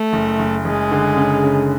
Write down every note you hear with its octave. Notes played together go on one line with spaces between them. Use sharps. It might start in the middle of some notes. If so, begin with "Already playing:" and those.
Already playing: A3
F#1
F#1
F#1 G#3
D3
C#3
C#3